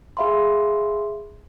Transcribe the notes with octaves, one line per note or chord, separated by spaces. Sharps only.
G#4 E5 F5 B5 C6